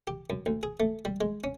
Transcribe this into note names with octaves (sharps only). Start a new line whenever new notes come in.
G4
F#2
D2
G#4
A3
G3
G#3
C#4